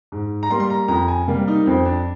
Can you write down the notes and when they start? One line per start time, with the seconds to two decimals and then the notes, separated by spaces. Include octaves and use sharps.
0.12 G#2
0.43 A#5
0.50 G3 A#3 C6
0.60 C6
0.70 A#5
0.88 F2 A#5
1.08 G#5
1.28 C3 G3 A#3
1.48 D#4
1.66 F2 C4
1.85 D4